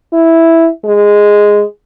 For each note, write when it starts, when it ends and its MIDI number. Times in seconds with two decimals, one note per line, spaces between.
0.13 0.68 64
0.85 1.63 56